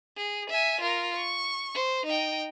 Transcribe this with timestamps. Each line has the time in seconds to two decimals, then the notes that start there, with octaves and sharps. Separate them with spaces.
0.17 G#4
0.49 E5 G#5
0.80 F4 A#4
1.16 C#6
1.75 C5
2.05 D#4 G5